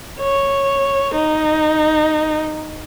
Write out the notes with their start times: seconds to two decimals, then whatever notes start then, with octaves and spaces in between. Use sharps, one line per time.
0.20 C#5
1.15 D#4